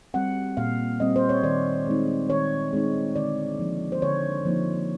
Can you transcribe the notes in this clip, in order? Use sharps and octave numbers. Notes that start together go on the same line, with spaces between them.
G3 C4 F#5
A#2 F5
G3 C4 D#5
C5
C#5
D#3 D5
G#3 C4 D#4
D#3 C#5
G#3 C4 D#4
D3 D5
F3 A#3 D#4
C5
D3 C#5
F3 A#3 D#4